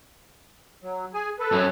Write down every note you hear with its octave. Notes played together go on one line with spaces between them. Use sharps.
F#3
G#4 G#5
A4 B4
F#2 C#4